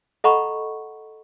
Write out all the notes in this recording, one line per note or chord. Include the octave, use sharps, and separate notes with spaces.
A4 D#5 F#5 A#5 B5 C#6